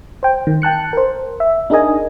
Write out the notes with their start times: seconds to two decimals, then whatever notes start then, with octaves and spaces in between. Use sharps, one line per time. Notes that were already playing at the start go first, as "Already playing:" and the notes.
0.23 C5 G5
0.47 D#3
0.62 G5 A5 F#6 C#7
0.93 A#4 C5
1.40 E5
1.70 D4 D#4 G#4 A#4 D#5 G#5